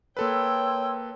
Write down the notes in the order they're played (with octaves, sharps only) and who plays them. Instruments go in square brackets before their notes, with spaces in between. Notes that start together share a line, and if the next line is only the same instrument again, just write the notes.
[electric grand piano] A#3 A4 B4 [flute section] C#5 C6 E6 [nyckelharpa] G5